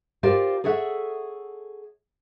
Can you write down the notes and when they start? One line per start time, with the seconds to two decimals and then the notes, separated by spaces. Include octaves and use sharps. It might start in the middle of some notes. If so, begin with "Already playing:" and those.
0.23 F4 G4 A#4 C5 D5 F5
0.64 G#4 A4 C#5 E5 F#5